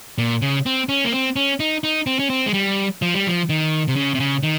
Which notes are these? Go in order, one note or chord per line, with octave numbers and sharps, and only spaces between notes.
A#2
C#3
C4
C#4
A#3
C4
C#4
D#4
D#4
C4
C#4
C4
G#3
G3
F3
G3
F3
D#3
C3
C#3
C3
C#3
D#3